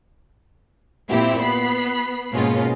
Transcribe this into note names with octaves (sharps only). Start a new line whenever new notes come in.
A#2 C4 E4 G4
B3 B5 C7
G#2 B2 G#3 A#3 C#4 F4